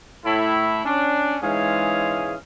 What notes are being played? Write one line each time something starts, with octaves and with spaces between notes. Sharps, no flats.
A2 E4
C#4 D4
G#2 E3 G#3 C#4 G#4 F5